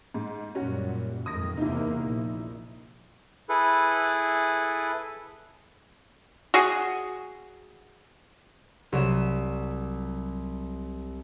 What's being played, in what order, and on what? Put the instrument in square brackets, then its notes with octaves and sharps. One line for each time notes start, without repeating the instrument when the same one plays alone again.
[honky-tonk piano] G#2
[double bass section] F#2 A#2 G3 [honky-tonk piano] C#4 F#4 F#5
[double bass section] F2 G#2 D#3 [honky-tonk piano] D#6 A#6
[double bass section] E2 C3 A#3 [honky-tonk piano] D#4 E4
[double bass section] A#1
[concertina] E4 G#4 A4 B4
[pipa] F#4 G#4
[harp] C2 F#3 E7